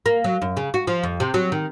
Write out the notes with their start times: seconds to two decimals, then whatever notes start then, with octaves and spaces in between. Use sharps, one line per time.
0.06 A#3
0.24 F#3
0.42 F#2
0.57 C#3
0.74 F#4
0.87 F3
1.03 F2
1.20 C3
1.34 F#3
1.52 D#3